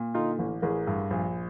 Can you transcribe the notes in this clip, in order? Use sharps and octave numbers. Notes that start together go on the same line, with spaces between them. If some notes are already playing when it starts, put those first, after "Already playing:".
Already playing: A#2
D3 D#4 F4
A1
A1 G#4 A#4
G2
A#1